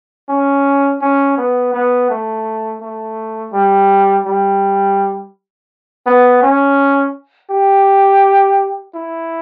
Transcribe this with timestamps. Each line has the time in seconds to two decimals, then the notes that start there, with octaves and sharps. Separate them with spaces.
0.29 C#4
1.01 C#4
1.37 B3
1.73 B3
2.10 A3
2.82 A3
3.53 G3
4.26 G3
6.06 B3
6.42 C#4
7.50 G4
8.95 E4